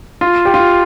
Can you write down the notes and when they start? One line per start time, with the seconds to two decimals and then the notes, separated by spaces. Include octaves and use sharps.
0.21 F4
0.45 G4
0.54 F4